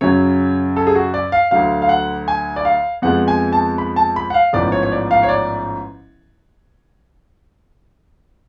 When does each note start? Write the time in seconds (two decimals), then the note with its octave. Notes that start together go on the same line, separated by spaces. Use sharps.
0.01 F#2 C#3 F#3 C#5
0.76 A4
0.87 G#4
0.95 F#4
1.14 D5
1.32 F5
1.51 D2 D3 F#3 F5
1.82 F5
1.89 F#5
2.28 G#5
2.56 D5
2.65 F5
3.02 F2 F3 G#3 B3 F#5
3.28 G#5
3.53 A5
3.78 B5
3.96 A5
4.16 B5
4.30 F#5
4.34 F5
4.53 A1 G#2 F3 B3 D5
4.72 C#5
4.83 C#5
4.92 D5
5.11 F5
5.23 C#5
5.29 D5